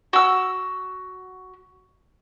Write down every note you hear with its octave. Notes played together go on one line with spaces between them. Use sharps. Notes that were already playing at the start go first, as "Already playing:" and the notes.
F#4 E6